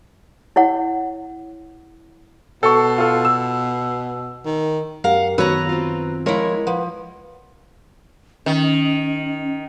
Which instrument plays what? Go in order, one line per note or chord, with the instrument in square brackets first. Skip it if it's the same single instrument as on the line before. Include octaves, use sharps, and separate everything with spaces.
[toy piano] E4 C#5 F#5
[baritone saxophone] B2 [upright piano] A4 C#6
[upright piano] F4 A4
E6
[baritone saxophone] D#3
[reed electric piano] F#2 G4 A#4 [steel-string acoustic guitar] F5 F#5
[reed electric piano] F#2 D#3 E6 [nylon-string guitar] B3 F#4 C#5 [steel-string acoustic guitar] B4 A#5
[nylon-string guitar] C4 F4
[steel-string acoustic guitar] F3 E4 [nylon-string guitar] G#3 A#4 C#5
[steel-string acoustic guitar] F3 [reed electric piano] B4 F#5
[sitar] D#3 [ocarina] C#4